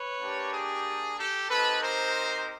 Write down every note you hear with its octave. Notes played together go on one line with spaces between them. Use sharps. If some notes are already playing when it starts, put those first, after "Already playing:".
Already playing: B4 C#5
A#3 D4 G4
G#4
G4 A4
C4 D#4 G4 A4 B4
A#4 C5